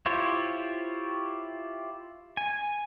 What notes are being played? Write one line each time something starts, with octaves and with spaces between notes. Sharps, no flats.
E4 F4 G4 C5 C#5
G#5